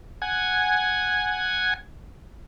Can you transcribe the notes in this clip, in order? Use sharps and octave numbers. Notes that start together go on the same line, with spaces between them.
F#5 G#5 G#6